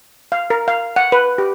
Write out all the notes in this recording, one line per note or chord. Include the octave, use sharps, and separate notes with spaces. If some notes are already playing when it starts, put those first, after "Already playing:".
F5
A#4
F5
F#5
B4
G4